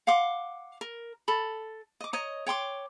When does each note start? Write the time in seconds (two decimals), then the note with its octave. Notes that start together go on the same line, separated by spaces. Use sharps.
0.07 F5 F#5 C6 D6
0.81 A#4
1.28 A4 B5
2.01 D#5 D6
2.13 C#5 D#5 A#5
2.46 C#5 G5 C6 D6